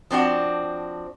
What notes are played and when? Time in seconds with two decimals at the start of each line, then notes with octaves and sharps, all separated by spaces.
0.11 F3 C4 D4 F#4